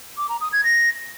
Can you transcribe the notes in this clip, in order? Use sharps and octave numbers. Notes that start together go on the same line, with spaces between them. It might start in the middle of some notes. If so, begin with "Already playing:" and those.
D6
A#5
D#6
G#6
A#6